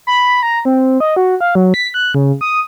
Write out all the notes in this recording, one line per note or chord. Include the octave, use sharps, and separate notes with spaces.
B5
A#5
C4
D#5
F#4
F5
F#3
B6
F#6
C#3
D#6